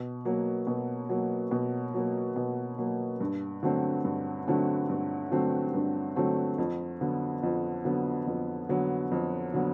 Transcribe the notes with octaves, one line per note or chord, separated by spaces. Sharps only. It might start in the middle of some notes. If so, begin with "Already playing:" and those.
Already playing: B2
F#3 A#3
B2
F#3 A#3
B2
F#3 A#3
B2
F#3 A#3
G2
D3 F#3 A3 C4
G2
D3 F#3 A3 C4
G2
D3 F#3 A3 C4
G2
D3 F#3 A3 C4
F2
D3 F#3 B3
F2
D3 F#3 B3
F2
D3 F#3 B3
F2
D3 F#3 B3